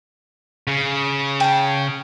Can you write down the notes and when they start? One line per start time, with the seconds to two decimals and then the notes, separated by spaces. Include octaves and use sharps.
0.67 C#3
1.40 G5 A5